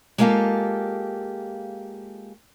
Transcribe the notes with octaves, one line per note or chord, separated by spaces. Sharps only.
G#3 A#3 B3 F4 G4 A4